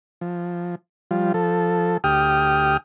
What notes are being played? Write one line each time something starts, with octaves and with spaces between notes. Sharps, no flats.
F3
F3 G3 F4
F3 A4
D2 G4 G5 D#6 F6